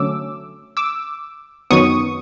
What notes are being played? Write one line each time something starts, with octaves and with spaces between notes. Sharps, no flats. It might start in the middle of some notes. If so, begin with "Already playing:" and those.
Already playing: D3 F#3 A3 C#4 D6 E6
D6 E6
F#2 D#3 F#3 B3 C#6 D#6